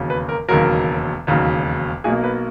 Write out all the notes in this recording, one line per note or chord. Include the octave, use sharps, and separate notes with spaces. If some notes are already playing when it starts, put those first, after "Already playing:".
Already playing: E1 D#2 C#3 F#3
B4
A#4
E1 D#2 C#3 F#3 A#4
E1 D#2 C#3 F#3
B1 B2 A#3 G#4
B4